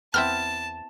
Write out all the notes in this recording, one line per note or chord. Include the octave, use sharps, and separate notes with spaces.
E2 B3 C4 E4 A5 F6